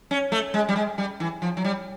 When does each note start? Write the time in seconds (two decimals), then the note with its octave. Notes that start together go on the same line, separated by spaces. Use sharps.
0.11 C#4
0.32 A3
0.54 G#3
0.69 G3
0.76 G#3
0.98 G3
1.20 E3
1.42 F3
1.57 F#3
1.64 G3